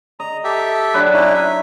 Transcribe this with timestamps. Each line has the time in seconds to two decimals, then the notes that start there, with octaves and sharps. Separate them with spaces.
0.20 D#5 A#5
0.44 G4 A4 E5
0.94 F#3 D4 B4
1.13 C#4 D#4 E4
1.34 E5